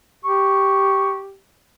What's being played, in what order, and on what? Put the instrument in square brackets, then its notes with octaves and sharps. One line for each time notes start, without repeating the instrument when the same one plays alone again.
[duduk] G4 [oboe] C#6